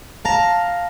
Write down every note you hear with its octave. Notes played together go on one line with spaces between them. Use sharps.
F5 A5 A#5